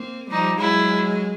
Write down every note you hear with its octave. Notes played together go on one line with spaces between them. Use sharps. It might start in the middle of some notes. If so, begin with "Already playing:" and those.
Already playing: A#3 C4
F3 G3 D#4
F#3 G#3 E4